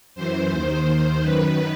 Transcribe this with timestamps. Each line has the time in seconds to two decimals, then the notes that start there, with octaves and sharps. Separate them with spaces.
0.15 F#2 E3 C5
0.51 D#2 D#3
0.86 D#2 D#3
1.22 F#2 D#3 B4